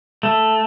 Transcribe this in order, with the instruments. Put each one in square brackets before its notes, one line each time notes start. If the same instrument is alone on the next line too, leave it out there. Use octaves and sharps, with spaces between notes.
[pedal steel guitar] A3